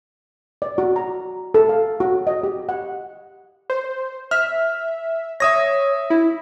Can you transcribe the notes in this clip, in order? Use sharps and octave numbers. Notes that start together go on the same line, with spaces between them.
D5
F#4
A#5
A4
F5
F#4
D#5
G4
F#5
C5
E5 F6
C#5 E5 D#6 A#6
E4